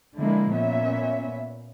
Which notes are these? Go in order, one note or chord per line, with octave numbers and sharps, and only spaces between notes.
D3 F3 G#3 A#3 E4
A#2 B3 C#4 E5